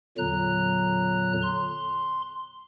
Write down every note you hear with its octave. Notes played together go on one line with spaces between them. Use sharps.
E2 A#2 D3 F#3 A#5 F#6
C6